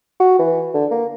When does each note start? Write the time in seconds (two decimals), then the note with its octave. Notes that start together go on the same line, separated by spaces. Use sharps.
0.20 F#4
0.39 E3
0.74 D3
0.91 A#3